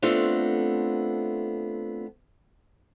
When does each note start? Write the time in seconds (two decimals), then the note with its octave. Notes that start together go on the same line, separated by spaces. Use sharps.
0.02 A3 B3 C4 D4 F4 A4